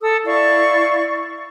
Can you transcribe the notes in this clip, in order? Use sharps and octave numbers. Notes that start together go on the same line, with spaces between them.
A4 D#6 E6
E4 D5 F5 C#6